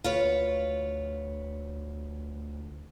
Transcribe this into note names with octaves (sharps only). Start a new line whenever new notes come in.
D2 F4 B4 C#5